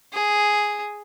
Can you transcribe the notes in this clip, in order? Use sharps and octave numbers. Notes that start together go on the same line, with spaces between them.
G#4